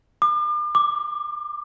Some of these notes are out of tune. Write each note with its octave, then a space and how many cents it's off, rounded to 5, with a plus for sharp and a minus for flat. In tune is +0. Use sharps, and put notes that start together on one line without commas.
D6 +40
D6 +5